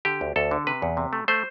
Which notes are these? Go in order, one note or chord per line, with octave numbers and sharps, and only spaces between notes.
D3 G4
D2
D2 A4
D3
C3 B4
E2
C3
A3
A3 C5